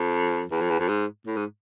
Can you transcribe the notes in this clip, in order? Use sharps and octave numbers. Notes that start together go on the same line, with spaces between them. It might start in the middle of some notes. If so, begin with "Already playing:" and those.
Already playing: F2
E2
F2
E2
F2
G#2
A2
G#2